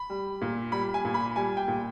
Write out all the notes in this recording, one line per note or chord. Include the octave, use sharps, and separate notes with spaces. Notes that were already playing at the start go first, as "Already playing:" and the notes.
Already playing: B5
G3
A#2
G3 B5
G#5
A#2
B5
G3 G#5
G5
A#2